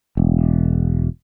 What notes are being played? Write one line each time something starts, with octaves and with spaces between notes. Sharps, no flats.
E1